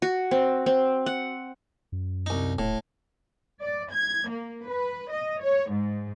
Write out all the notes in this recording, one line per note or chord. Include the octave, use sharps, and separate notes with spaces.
F#4
C4
C4
F#5
F#2
C2 D#4
D#1 A2
D5
G#6
A#3
B4
D#5
C#5
G#2